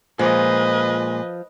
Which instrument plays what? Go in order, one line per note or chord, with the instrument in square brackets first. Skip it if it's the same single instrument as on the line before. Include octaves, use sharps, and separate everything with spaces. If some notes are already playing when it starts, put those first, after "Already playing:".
[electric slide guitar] A#2 G#3 [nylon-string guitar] F3 [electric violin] B4 D#5